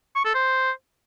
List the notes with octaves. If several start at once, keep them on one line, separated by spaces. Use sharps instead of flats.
C#6
A4
C5